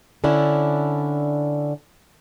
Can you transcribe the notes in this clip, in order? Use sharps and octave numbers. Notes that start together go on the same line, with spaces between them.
D3 C#4 D4 E4